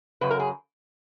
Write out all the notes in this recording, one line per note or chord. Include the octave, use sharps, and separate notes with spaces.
F#2 C#3 F#3 B4
A#4
G#4